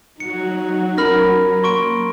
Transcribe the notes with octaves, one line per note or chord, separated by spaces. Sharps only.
F#3 D#4 F#4 C#7
C#4 A#4 B5 F6 A#6
A#3 C6 C#6 D7